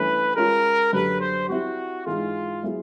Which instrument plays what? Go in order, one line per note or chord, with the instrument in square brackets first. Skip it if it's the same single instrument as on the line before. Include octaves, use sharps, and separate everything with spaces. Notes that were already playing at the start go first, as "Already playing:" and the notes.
Already playing: [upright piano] G2 E3 A3 C#4 [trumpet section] B4
[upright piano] G#3 C#4 F4 [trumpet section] A#4
[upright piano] F#2 D3 G3 [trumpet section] B4
[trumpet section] C5
[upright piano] G3 C4 E4 [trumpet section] F#4
[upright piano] G#2 E3 G#3 [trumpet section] F4
[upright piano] F#3 B3 E4 G#4